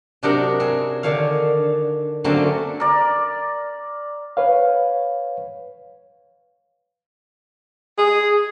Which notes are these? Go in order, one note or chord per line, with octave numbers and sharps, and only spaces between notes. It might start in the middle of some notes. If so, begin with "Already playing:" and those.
C3 F#3 D4 D#4 A#4 F#5
C4 G#4
D3 D#3 D4 C#5 F5
D3 F#3 A3 A#3 C4 C#4
A#4 D5
B4 C#5 F5
G#4